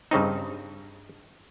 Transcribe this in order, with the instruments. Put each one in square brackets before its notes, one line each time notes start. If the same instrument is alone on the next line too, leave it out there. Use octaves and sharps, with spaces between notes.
[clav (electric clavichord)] G2 C#3 C4 D#4